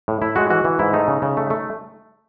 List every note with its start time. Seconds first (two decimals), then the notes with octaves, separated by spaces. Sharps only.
0.08 A2
0.22 A2 E4
0.36 G#3 F#4
0.50 E3 F#4
0.65 E3
0.79 G#2 E4
0.93 A3 D#4
1.08 C#3
1.22 C#3
1.37 A3
1.50 A3